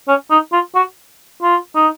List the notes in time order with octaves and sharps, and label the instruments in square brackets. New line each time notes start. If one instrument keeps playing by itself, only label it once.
[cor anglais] C#4
D#4
F4
F#4
F4
D#4